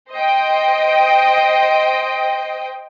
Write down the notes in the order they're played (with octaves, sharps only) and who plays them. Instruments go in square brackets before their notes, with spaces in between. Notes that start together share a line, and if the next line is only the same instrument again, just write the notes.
[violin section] C5 D#5 G5